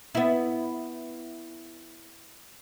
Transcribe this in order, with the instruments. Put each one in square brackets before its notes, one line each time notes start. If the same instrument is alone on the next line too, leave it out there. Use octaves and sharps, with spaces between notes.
[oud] B3 E4